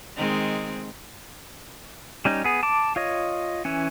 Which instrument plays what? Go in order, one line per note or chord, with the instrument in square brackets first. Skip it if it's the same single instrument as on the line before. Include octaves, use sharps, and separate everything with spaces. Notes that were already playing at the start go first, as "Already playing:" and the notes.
[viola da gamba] D#3 G#3 C4
[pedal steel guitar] G3 C#4 D#4
B3 G#4
A5 D6
F4 C#5 D#5
E3 C#4